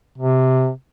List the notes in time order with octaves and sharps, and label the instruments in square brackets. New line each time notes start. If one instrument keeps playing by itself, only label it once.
[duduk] C3